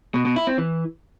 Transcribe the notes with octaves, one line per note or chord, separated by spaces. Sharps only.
B2
B2
E4
C4
E3